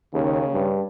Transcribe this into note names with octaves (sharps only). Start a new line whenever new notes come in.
D#2 C#3
G2